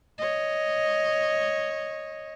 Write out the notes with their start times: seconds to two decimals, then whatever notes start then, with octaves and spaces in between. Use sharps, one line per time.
0.18 C#5 D#5